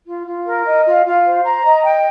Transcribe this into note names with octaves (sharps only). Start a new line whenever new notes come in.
F4
F4
A#4
D#5
F4
F4
C5
A#5
D#5
G5